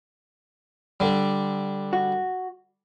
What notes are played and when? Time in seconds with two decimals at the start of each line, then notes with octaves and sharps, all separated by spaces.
1.00 D3 G3
1.93 F#4